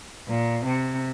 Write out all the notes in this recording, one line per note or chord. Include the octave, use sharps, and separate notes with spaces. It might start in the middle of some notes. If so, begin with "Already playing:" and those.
A#2
C3